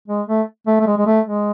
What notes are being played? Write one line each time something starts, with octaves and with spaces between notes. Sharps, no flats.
G#3
A3
A3
A3
G#3
G#3
A3
G#3